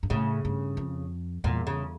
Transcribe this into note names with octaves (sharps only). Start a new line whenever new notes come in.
G2
A2 C#3
G2
F2
E2 A#2
C#3